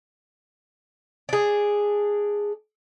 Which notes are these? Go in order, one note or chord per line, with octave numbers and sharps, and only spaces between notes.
D4 G#4